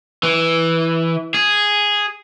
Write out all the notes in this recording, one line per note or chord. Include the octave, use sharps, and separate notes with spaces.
E3
G#4